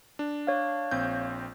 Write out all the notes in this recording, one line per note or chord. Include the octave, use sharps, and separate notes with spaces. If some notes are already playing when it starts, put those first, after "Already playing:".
D4
C#5 F5
A#1 C4 G6